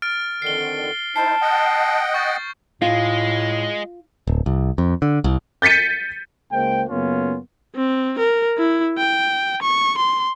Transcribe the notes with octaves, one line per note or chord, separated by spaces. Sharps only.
F6 A6 D7
F2 D3 D#3 C7 G7
D#4 E4 C5 A5 C7
D#5 F#5 G5
C#6 G6 A6
A2 G#3 F4
D1
C2
F2
D3
C2
G6 A6 B6 C#7 D#7
C#2 G#3 A#3 C5 G5
F#2 C#3 A#3 B3 C#4 F4
C4
A#4
E4
G5
C#6
C6